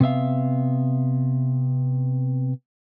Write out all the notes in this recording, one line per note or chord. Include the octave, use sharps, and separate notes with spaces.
C3 B3 E5 F5